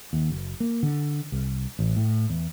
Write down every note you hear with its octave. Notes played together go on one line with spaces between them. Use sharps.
D#2
F#1
A#3
D3
C2
A1
A2
E2